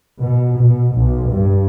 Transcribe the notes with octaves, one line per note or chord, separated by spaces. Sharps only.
B2
B2
B1
G2